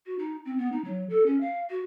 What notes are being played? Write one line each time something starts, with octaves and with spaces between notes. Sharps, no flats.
F#4
D#4
C4
B3
D#4
F#3
A4
C#4
F5
F#4